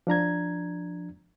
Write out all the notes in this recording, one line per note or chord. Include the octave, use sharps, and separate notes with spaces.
F3 D4 A#5 G#6